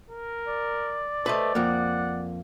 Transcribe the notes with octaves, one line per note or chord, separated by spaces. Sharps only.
A#4
D5
A3 B4 C5 D#5
F2 A#3 F#5